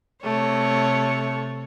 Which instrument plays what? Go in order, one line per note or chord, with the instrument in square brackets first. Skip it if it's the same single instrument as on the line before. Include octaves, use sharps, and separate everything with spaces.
[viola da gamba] C3 C#5 [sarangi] A3